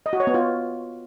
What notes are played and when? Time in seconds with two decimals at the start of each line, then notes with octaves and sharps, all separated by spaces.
0.06 D#5
0.13 F#4
0.20 C#5
0.27 B3
0.34 F4